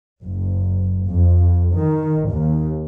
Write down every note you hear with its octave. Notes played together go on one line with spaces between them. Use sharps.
F#1
F2
D#3
D#2